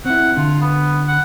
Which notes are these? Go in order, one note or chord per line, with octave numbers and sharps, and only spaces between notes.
C4 E4 F#5
D3 F4
B3
F#5